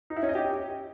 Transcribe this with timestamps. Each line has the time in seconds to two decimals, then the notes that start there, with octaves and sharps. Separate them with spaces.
0.10 D#4
0.16 E4
0.23 C#4
0.29 D#5
0.35 G4